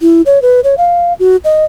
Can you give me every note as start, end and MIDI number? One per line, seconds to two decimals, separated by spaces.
0.02 0.22 64
0.26 0.41 73
0.42 0.60 71
0.64 0.75 73
0.78 1.13 77
1.19 1.37 66
1.44 1.65 75